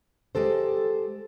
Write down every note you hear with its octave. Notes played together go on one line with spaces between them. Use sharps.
G#3 G4 A4 C5